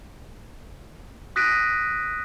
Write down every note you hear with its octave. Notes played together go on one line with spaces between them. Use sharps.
D#6 F#6 A#6 B6 D7 D#7